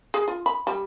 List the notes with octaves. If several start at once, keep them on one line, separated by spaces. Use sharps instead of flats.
G#4
F4
B5
G3